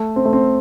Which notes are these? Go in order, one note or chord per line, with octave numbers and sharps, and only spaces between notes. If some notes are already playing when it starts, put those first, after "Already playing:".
Already playing: A3
C4
A3
C4